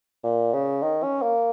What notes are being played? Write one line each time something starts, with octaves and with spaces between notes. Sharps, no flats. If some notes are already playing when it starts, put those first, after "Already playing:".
A#2
C#3
D#3
C#4
A#3